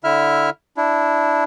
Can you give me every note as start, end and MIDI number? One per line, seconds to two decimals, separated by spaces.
0.04 0.50 50
0.04 0.50 64
0.04 0.50 76
0.04 0.50 89
0.77 1.44 62
0.77 1.44 64